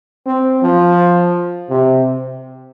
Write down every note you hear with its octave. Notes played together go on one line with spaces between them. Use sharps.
C4
F3
C3